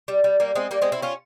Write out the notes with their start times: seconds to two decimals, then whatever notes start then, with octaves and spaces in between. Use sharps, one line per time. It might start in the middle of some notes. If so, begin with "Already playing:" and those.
0.08 G3
0.24 G3
0.40 G3 A#3
0.55 G#3 C4
0.71 G3 A#3
0.82 G#3 C4
0.92 C4 E4
1.02 C#4 F4